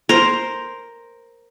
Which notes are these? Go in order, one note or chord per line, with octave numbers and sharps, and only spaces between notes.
A#4 C5